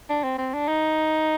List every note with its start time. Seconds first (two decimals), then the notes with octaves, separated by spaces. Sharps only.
0.09 D4
0.24 C4
0.38 C4
0.54 D4
0.68 D#4